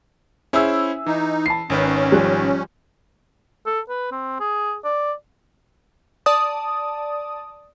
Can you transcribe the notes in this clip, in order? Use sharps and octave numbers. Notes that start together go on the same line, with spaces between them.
C#4 E4 G#4 C5 E5 E6
E3 D#4
A5 B5 C7
G#1 D#3 C#4 B4
F3 G3 F#6
A4
B4
C4
G#4
D5
D5 A5 D#6